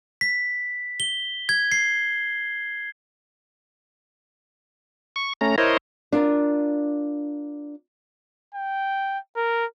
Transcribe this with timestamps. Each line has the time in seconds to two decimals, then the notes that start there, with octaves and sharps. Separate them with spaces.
0.21 B6
1.00 G7
1.49 G#6
1.72 C7
5.16 C#6
5.41 A3 C#4 A#5
5.58 E4 A#4 C5 C#5 D#5
6.12 D4 F4 A#4
8.55 G5
9.36 A#4